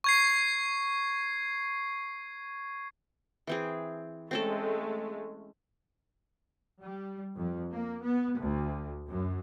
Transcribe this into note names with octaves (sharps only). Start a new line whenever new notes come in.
C#6 G#6 C7
E3 C4 G#4
G#3 A3 C4 C#4 A4
G3
F2
A#3
B3
D2
F#2